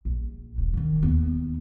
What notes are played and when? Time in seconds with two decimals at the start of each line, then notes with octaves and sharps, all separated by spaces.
0.05 A#1
0.58 D#1
0.73 D3 D#3
1.02 D#2 B3